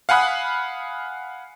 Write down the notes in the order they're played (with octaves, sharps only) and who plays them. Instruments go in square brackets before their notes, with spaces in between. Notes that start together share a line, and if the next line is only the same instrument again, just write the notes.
[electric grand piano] F5 F#5 G#5 B5 D#6 F#6